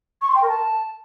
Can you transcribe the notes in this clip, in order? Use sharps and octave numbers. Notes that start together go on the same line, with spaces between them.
C#6
C6
G5
A#4
A5